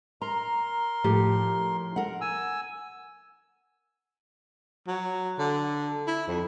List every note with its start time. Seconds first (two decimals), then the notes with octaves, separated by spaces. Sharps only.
0.22 A#4 A#5 C6
1.04 A2 F3 G4
1.96 A#4 F#5
2.21 G#5 E6
4.88 F#3
5.39 D3
6.07 E4
6.28 F2